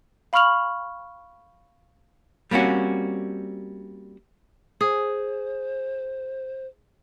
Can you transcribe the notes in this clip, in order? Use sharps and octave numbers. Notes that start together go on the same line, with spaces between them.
F5 B5 C#6 F6 F7 F#7
G3 A#3 C4 C#4 F#4
G#4 C5